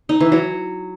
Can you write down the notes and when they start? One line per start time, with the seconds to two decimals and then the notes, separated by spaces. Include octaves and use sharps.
0.09 D#4
0.20 E3
0.32 F#3